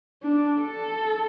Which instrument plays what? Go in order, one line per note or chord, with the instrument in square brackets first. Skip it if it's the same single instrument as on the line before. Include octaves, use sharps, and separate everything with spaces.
[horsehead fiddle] D4
A4